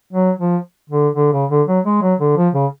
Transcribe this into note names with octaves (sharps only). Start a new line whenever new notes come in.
F#3
F3
D3
D3
C#3
D3
F#3
G#3
F#3
D3
F3
C#3